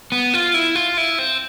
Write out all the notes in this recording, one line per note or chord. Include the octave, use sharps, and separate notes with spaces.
B3
F4
E4
F4
E4
C4